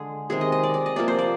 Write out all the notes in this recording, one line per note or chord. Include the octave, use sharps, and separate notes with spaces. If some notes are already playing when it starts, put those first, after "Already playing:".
Already playing: D3 G#3 G#4
C3 D#3 G#3 G#4
D#5
D#5
D5
D5
D#5
C3 F3 A#3 D5
C5
D5